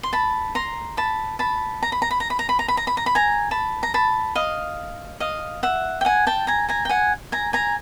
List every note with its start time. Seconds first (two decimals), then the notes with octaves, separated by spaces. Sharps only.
0.03 C6
0.13 A5 B5
0.55 A#5 C6
0.97 A5 B5
1.39 A5 B5
1.83 A#5
1.92 B5
2.02 A#5
2.11 B5
2.20 A#5
2.30 B5
2.39 A#5
2.49 B5
2.59 A#5
2.68 B5
2.77 A#5
2.87 B5
2.97 A#5
3.06 B5
3.15 G#5 A#5
3.51 A5 B5
3.83 A#5
3.94 A5 B5
4.35 D#5 F5
5.20 D#5 F5
5.63 E5 F#5
6.01 G5
6.05 F#5 G#5
6.27 G5 A5
6.47 G#5 A#5
6.69 G#5 A#5
6.85 G5
6.89 F#5 G#5
7.32 G#5 A#5
7.53 G#5 A#5